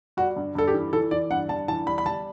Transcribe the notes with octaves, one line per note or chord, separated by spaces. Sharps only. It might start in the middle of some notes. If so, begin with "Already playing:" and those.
G3 F#4
G2
G2 A4
G4
E3
E3 A4
E3 D5
G2 F#5
G2 A5
E3 A5
G3 B5
B5
G3 A5